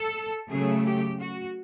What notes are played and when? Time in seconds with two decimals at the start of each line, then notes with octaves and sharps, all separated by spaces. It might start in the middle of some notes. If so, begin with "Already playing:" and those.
Already playing: A4
0.50 C#3 F#3 A3 G#4
0.84 G4
1.20 F#4